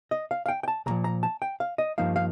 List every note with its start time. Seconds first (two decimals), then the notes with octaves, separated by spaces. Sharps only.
0.11 D#5
0.31 F5
0.46 F5
0.48 G5
0.63 G5
0.68 A5
0.86 C2 A#2 F3 A#5
1.04 A#5
1.23 A5
1.42 G5
1.60 F5
1.78 D#5
1.98 G2 F3 A#3 D#4 F5
2.16 F5